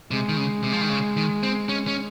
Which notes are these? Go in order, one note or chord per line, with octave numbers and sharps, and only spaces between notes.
C3 G#3
D#3
C#3
C3
F3
D#3
C#3
D#3
C4
C#4
C#4